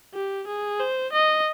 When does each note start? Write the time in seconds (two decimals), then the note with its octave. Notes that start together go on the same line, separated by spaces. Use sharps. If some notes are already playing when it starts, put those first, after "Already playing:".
0.14 G4
0.47 G#4
0.80 C5
1.13 D#5